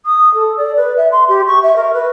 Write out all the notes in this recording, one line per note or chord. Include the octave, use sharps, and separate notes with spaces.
D#6
A4
D5
B4
E5
C6
G4
C#6
E5
A#4
B4